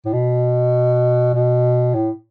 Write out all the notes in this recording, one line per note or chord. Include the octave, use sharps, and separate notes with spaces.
A2
B2
B2
A2